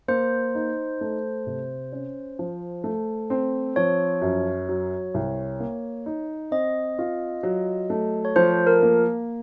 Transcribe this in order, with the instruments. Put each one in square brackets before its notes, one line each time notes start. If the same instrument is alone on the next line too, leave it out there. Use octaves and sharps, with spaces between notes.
[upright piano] A#3 [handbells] C5
[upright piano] D#4
A3
C3
C#4
F3
A3
C4
[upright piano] F3 [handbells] C#5
[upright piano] F#2
F#3
C2
A#3
D#4
[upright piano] C4 [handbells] D#5
[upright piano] F4
F#3
A3
[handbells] C#5
[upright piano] F3 [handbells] C5
[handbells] A#4
[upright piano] A#3